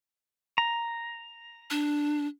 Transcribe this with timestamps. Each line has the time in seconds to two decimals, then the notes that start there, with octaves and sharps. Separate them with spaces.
0.58 A#5
1.70 D4